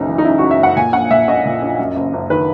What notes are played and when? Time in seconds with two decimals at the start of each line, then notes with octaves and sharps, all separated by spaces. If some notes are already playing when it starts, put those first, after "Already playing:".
Already playing: F#1 B1 F#2 D#4
0.08 E3
0.18 D#4
0.25 C#3 E4
0.38 F#2 F#4
0.51 E5
0.59 F#1 F#5
0.76 A#2 G#5
0.93 A#1 F#5
1.10 A#2 E5
1.27 A#1 D#5
1.45 A#2
1.62 A#1
1.79 F#2
1.96 F#1
2.13 F#1
2.30 D#3 B4